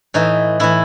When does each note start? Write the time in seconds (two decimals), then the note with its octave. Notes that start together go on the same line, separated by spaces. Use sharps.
0.14 A2 E3 D#4
0.60 A2 E3 E4